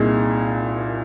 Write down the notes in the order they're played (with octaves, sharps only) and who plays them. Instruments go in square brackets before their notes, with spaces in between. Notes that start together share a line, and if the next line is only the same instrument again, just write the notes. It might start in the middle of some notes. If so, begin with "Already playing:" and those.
Already playing: [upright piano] C2 A#2 D#4 G#4